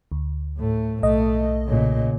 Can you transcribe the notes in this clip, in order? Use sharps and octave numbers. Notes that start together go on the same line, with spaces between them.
D2
A2 A3
B1 A3 D#5
A#2 C#3